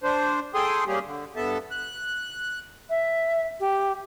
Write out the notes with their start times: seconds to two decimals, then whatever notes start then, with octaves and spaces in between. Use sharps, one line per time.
0.03 D4 C5
0.54 G#4 A4 G5 C6 D#6
0.87 G3 A#3 C#4 G4 G#4
1.05 D3
1.36 G2 B3 A4 E5 A5
1.71 F#6
2.90 E5
3.60 G4